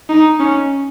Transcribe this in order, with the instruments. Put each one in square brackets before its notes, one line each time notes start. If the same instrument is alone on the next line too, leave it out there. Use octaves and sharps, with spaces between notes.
[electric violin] D#4
C#4